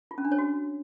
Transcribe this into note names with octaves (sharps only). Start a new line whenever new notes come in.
F4
C#4
D4
C#5
F#4